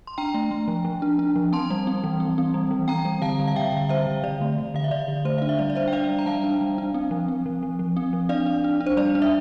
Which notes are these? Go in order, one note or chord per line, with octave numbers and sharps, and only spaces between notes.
C6
D4 G5 A#5
A3
A3
F3
F3
D4
D4
F3
C4 A5 C6
G3
C4
E3
C4
C4
G3
E3
C4 G5 A#5
G3
D3 F5 A5
G3
F5
D3 E5 G5
D3
G3 C5 E5
D3
D3 D5
A3
D3
D3 F5
E5
D3 D5
D3
A3 C5
D4 F5
E5
G3 D5
D5
D4 C5 E5
G5
D4 D5 F5
G3
A#5
G3 F5 A5
D4
G3
D4
C4
F3
C4
F3
F3
F3
C4
F3
D4 D5 F5
D4
D4
D4
C5
G3 D5
D4
E5